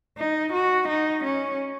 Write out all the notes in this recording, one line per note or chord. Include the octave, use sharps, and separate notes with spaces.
D#4
F#4
D#4
C#4